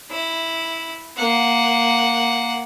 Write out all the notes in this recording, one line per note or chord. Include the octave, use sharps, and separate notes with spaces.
E4
A#3 F#5